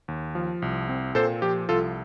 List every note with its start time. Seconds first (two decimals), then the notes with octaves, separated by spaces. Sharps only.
0.08 D#2
0.35 F3
0.62 C2
0.89 C4
1.15 A#2 A4 C5
1.42 F3 G4
1.69 C2 F4 A4